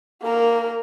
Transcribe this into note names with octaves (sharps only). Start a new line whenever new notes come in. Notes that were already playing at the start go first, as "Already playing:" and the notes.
A#3 A#4